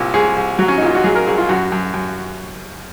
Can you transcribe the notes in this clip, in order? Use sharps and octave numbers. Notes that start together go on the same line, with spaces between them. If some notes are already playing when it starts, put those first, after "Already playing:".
Already playing: C2 A#2
C2 G#4
C2
F#3 F#4
C#4
D#4
A#2 F4
F#4
F#3 G#4
A#4
C2 G#4
F4
F#2 F#4
F#2
F#2